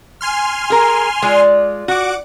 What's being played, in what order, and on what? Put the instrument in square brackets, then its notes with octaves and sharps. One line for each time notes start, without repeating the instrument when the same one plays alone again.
[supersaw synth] G#5 C6 F6
[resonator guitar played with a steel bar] G#4 A#4
[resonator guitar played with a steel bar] G#3 [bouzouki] F4 D5
[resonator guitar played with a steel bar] F#4 [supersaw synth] F#5 D6